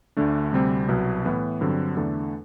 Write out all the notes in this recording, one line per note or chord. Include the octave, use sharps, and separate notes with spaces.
D2 D3 A3 D4
D2 C3 G3 C4
C2 B2 F#3 B3
A2 E3 B3
G2 D3 F#3 C4
E2 D3 A3 D4 A4